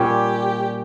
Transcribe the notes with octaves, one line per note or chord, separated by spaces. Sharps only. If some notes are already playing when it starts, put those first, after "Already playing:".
Already playing: A#2 G3 C#4 F4 G4